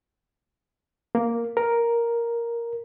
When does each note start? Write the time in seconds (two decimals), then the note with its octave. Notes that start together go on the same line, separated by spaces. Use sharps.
1.15 A#3
1.57 A#4